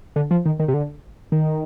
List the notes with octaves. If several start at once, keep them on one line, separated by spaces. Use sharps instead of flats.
D3
F3
D#3
D#3
C3
D3
D#3